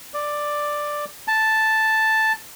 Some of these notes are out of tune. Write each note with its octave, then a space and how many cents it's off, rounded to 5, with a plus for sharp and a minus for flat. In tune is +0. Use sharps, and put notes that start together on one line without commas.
D5 +5
A5 +0